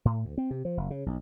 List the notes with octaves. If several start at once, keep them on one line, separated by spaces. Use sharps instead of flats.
A2
D2
C4
C3
F3
F#1
C#3
B1